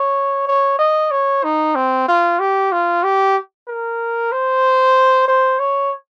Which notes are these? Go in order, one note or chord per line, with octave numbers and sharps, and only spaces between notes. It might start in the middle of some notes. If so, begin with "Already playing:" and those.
Already playing: C#5
C#5
D#5
C#5
D#4
C4
F4
G4
F4
G4
A#4
C5
C5
C#5